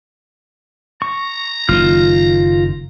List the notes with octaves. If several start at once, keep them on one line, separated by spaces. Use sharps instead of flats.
A#5 C#6
F#1 F#2 D#3 F4 F6